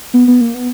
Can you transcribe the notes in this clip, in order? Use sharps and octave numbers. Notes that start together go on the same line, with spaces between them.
B3
B3
A#3
B3